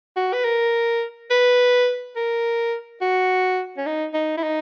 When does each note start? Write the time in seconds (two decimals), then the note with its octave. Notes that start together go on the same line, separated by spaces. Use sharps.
0.16 F#4
0.33 B4
0.44 A#4
1.30 B4
2.16 A#4
3.01 F#4
3.77 C#4
3.86 D#4
4.14 D#4
4.37 E4
4.43 D#4